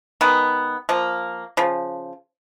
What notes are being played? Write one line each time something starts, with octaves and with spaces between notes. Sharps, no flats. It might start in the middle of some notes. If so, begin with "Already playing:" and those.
D#3 G#3 B3
F3 A#3
C#3 F3